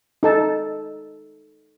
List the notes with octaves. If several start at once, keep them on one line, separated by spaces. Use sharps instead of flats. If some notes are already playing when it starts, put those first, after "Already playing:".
D#4 A4 A5